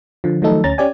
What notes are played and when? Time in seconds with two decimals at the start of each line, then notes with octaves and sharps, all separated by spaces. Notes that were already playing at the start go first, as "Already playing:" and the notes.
0.24 D3 F3
0.42 D#3 F3 F#3 A3 D#4 A4
0.64 D2 C#4 A#5 A6
0.78 C#4 G4 D5 G#5